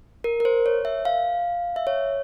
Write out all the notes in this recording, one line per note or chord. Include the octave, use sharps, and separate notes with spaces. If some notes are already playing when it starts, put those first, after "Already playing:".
A#4
A#4
C5
C#5
E5
F5
E5
C#5